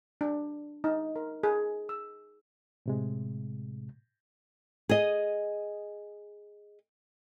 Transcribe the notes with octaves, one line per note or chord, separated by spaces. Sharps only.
D4
D#4
A#4
G#4
E6
A2 C3 G#3
G#4 D#5